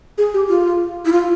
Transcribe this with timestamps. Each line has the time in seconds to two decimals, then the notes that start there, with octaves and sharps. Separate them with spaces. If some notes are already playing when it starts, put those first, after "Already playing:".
0.18 G#4
0.34 G4
0.49 F4
1.05 E4
1.12 F4